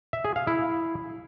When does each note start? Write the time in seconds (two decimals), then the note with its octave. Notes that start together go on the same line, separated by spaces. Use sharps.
0.13 E5
0.24 G#4
0.36 F5
0.47 E4